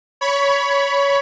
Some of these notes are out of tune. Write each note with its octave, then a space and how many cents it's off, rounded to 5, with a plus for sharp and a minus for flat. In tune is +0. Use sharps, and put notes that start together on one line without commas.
C#5 +15 B5 +0